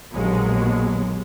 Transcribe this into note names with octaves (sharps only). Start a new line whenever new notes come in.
A#1 D#2 B2 F#3 G#3